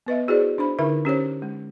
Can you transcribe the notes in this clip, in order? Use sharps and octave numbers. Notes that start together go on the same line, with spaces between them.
B3 B4 D#5 E5
E4 F#4 G#4 B4 C5 D5
D4 C5 B5
D3 D#4 E4 A#4 E5
C#4 G4 C5 C#5
G#3